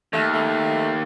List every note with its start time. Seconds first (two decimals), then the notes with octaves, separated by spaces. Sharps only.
0.13 D#2 A3
0.34 A3